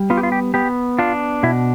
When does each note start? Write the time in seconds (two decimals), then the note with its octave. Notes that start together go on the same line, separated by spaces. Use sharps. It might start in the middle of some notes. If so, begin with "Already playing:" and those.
Already playing: G3
0.10 B3 F4
0.17 G4
0.23 F4
0.32 G4
0.54 B3 G4
0.99 D4 F4
1.43 B2 E4